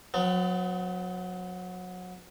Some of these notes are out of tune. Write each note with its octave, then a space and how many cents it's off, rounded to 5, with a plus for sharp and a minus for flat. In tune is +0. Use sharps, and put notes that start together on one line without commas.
F#3 -25 B3 +40